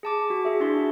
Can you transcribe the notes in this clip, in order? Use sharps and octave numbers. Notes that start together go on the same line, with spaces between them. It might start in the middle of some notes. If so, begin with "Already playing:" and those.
G#4 A5 D6
F#4
G#4 E5
D4 E4 F#4 G#4 C6